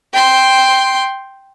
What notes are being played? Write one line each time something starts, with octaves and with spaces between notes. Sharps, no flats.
G5 C6